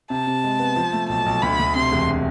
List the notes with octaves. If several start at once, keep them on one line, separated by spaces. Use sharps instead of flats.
C3 A5
C3
G#3
B3
F3
A3
B1 A5
B1
D2 B5
D2
C3 C6
E1